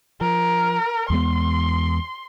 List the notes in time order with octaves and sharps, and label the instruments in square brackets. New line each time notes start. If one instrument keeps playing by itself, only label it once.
[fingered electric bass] F3 [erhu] A#4
[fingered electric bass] E2 G#3 B3 [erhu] C6